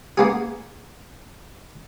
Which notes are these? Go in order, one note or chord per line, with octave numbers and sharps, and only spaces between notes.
A#3 B3 G#4